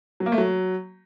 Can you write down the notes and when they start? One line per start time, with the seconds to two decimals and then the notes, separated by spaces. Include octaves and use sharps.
0.20 F#3
0.26 A#3
0.32 A3
0.38 F#3